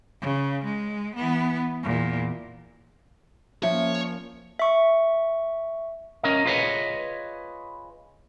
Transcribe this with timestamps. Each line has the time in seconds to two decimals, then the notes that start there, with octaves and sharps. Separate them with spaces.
0.21 C#3
0.64 G#3
1.16 E3 B3
1.83 E2 A#2
3.63 F3 A#3 C#4 C#5 E5
4.59 E5 C#6
6.23 C#4 A#4 D#5
6.45 F4 G#4 B4 C#5 D#5